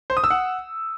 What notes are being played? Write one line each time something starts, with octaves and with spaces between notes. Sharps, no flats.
C5
D#6
E6
F#5